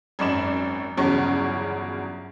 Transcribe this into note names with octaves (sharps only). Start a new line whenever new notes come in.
G#1 F#2 C#4 D5 E7
G1 E2 C#3 F#3 C#4 C#6